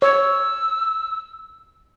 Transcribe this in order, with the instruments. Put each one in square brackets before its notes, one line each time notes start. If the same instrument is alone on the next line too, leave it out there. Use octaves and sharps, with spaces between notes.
[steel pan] C#5 [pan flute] E6